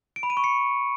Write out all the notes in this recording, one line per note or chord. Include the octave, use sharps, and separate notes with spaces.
D7
B5
D#7
C#6
C#7